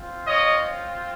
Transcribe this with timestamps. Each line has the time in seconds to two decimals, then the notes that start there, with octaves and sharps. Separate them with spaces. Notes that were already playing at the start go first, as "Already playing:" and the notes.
Already playing: C4 F4
0.26 C#5 D#5